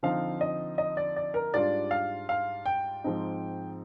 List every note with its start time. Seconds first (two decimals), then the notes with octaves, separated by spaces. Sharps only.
0.03 D3 F3 C4 D#4 F5
0.41 D#5
0.78 D#5
0.97 D5
1.16 D5
1.34 A#4
1.54 G#2 G3 D4 F4 D5
1.91 F5
2.29 F5
2.66 G5
3.04 G#2 F3 C4 D#4